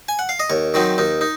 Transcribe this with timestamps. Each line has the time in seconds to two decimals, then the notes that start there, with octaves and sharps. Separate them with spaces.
0.09 G#5
0.19 F#5
0.29 F5
0.40 D#5
0.50 D#2 C#5
0.74 D#3 F#3 C4 D#4
0.98 D#2 D#4
1.21 D#4